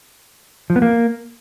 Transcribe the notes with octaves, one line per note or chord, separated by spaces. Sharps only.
F3
B3
A#3